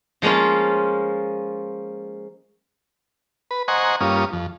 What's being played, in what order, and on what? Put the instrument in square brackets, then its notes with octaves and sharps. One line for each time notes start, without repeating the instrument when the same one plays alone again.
[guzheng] F3 G#3 A#3 C#4 F4
[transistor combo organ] B4
C5 D#5 F#5 G#5 A#5 C#6
G2 A#3 C#4 F4 D#6
F2